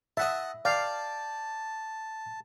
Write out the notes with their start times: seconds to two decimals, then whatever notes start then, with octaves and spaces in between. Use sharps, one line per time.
0.17 D#5 E5 F#5 A5
0.65 D5 F5 G5 A5